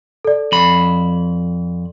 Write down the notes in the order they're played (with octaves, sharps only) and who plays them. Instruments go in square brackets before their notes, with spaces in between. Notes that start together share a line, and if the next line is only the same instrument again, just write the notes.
[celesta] A4 D5
[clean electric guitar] F2 B5